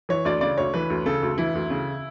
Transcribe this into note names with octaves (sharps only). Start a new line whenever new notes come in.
E3 C#5
D2 D5
C#3 D5
D2 C#5
E3 B4
D2
C#3 A4
D2
E3 E4
D2
C#3